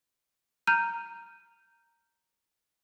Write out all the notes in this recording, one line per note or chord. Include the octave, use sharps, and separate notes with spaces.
A#5 F6 G6 D#7